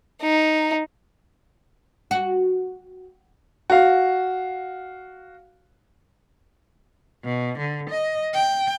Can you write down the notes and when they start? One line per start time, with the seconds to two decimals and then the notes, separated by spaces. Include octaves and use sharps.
0.22 D#4
2.11 F#4
3.70 F#4 F5
7.24 B2
7.59 D3
7.90 D#5
8.34 G5